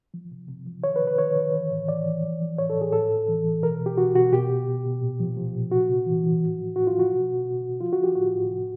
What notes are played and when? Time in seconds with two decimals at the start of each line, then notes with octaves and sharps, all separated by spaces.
0.14 F3
0.32 C3
0.49 C3
0.66 F3
0.84 D#3 C#5
0.96 B4
1.02 C3
1.07 B4
1.18 D#3 C#5
1.36 D#3
1.54 E3
1.70 A2
1.88 E3 D5
2.06 E3
2.23 F3
2.41 F3
2.58 A2 C#5
2.70 A4
2.76 A2
2.81 G#4
2.93 A2 A4
3.10 A2
3.28 E3
3.45 E3
3.62 B2 A#4
3.80 B2
3.86 G4
3.98 B2 F#4
4.15 B2 F#4
4.33 B2 G4
4.49 B2
4.67 B2
4.85 B2
5.01 A#2
5.20 F3
5.37 F3
5.54 A#2
5.71 C3 F#4
5.89 C3
6.06 E3
6.24 E3
6.41 A2
6.59 F3
6.76 A2 F#4
6.87 F4
6.93 F3
6.99 F#4
7.11 B2
7.28 B2
7.46 B2
7.63 B2
7.81 F3 F4
7.93 F#4
7.98 F3
8.04 G4
8.15 A2 F#4
8.33 A2
8.50 C3